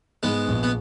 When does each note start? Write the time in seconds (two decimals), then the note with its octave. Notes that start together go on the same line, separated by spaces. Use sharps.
0.23 G#2 G#3 B3
0.47 A#1
0.63 B3